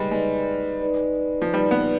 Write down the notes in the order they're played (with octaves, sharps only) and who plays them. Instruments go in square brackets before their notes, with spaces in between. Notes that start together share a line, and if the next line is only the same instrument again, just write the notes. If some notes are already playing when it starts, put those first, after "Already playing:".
Already playing: [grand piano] G3 G#3 [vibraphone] D#4 B4 D5
[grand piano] G#3 [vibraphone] D#4 B4 D5
[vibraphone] D#4 B4 D5
[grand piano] F3
[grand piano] G3 [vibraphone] D#4 B4 D5
[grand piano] B3